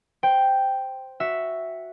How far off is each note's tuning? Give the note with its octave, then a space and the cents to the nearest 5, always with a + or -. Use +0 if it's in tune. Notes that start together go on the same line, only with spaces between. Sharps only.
C5 +0 G5 +0
F#4 -5 E5 +0